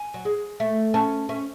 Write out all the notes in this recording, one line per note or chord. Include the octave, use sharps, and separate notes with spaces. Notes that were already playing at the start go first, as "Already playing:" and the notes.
Already playing: G#5
F#3
G#3 G#4
A3 E5
C#4 A5
C#4 E5